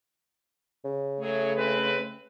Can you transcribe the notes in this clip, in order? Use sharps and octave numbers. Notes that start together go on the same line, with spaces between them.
C#3
F#3 A3 G#4 C#5
G#3 C4 B4